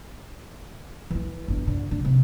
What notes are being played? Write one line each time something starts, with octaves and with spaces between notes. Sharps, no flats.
E3 E4
G1
D3
D3
C3